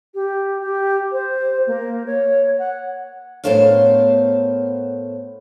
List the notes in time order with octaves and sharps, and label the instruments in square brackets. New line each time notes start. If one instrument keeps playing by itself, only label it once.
[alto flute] G4
G4
C5
A#3
C#5
F#5
[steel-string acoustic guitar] A2 B3 A#4 C5 C#5 F5